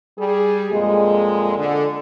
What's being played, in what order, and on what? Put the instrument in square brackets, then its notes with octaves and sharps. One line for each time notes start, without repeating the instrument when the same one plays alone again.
[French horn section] G3 G#4
F2 A#2 G#3
D3